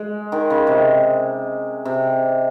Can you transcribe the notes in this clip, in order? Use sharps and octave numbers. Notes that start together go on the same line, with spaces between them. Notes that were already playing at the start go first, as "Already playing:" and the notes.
Already playing: G#3
D#3
C#3
C3
C3